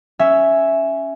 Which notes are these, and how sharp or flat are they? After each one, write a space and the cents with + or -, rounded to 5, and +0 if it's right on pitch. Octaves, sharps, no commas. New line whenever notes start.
C#4 +0 E5 +0